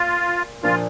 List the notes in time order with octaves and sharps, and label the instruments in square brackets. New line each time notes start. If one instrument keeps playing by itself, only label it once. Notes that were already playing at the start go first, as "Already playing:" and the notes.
Already playing: [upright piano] A#2 [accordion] F4
[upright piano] A#2 F3 A#3 D4 [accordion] F4